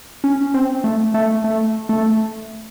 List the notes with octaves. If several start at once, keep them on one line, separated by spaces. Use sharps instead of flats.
C#4
C4
A3
A3
A3
A3